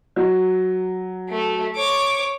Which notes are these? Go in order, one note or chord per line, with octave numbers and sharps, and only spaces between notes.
F#3
A3
C#5 D6